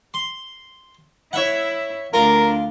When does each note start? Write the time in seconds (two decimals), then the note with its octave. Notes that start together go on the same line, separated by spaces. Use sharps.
0.14 C6
1.33 E4 C#5 E5 F#5
2.14 D2 D4 F4 A#4